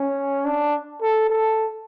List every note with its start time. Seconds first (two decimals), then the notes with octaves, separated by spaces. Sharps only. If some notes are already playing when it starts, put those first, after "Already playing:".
Already playing: C#4
0.45 D4
1.02 A4
1.30 A4